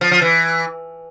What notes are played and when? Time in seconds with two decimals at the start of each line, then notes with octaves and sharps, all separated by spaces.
0.01 F3
0.11 F3
0.22 E3